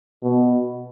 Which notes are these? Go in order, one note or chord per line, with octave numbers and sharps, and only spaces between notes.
B2